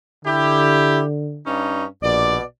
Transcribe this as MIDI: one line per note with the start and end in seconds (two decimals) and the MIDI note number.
0.25 1.42 50
0.25 1.01 64
0.25 1.01 67
1.45 1.84 43
1.45 1.84 61
1.45 1.84 63
2.02 2.37 34
2.02 2.41 47
2.02 2.41 74